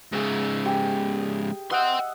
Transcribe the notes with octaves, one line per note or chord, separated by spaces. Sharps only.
G#2 C#3 G#4 E5
G4 G#4
D#5 E5 F#5 G5 C6